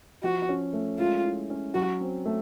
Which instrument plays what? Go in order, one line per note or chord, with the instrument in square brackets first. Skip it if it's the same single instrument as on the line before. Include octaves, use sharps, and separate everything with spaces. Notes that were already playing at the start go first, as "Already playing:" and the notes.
[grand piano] F3 [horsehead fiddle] F#4
[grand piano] C#4
A3
[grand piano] G#3 [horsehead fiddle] F4
[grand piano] E4
C#4
[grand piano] F#3 [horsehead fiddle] F#4
[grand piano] C4
A3